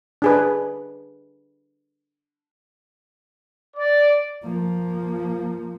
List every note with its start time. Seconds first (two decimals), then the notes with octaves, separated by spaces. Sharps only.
0.22 D4 G#4 B4
3.77 D5
4.44 F3 A#3